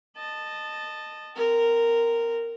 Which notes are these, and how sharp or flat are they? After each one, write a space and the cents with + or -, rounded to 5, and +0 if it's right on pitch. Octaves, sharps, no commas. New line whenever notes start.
D#5 -20 A5 +0
C4 -25 A#4 -10